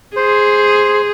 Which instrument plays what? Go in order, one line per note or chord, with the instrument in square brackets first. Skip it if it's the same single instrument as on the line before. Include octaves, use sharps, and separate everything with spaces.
[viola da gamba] G#4 [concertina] C5